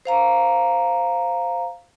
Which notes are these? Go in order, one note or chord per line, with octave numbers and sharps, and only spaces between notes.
C5 F5 A#5